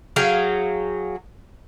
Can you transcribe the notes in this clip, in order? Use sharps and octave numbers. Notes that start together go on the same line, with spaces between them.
F#3 G#4 F5 G5